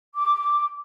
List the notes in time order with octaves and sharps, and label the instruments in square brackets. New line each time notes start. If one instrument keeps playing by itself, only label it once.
[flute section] D6